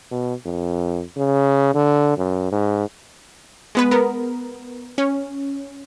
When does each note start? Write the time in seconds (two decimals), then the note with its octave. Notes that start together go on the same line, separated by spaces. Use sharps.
0.11 B2
0.46 F2
1.17 C#3
1.75 D3
2.17 F#2
2.52 G#2
3.75 G#3 B3 B4
3.91 B3 A#4
4.98 C#4